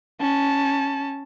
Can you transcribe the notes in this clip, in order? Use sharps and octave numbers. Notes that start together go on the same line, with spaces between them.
C#4 A5